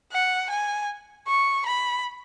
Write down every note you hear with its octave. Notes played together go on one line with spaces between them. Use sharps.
F#5
G#5
C#6
B5